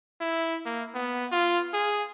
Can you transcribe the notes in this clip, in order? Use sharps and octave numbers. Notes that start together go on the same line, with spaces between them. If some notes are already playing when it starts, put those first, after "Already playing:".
E4
A#3
B3
F4
G#4